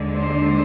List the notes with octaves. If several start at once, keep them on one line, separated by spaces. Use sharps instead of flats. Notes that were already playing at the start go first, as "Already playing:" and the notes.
Already playing: D#2 D3 G#3 D4
C5